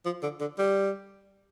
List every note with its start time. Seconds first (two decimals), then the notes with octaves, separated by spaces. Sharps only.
0.05 F3
0.23 D3
0.40 D3
0.58 G3